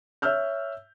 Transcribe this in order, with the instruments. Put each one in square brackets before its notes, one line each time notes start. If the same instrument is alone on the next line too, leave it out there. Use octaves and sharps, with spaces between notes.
[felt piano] C#5 E5 E6 F6 G6